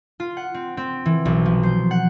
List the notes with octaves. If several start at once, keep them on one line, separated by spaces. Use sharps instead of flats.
F4
F#5
C4
C4
E3
B1
F3
C5
F#5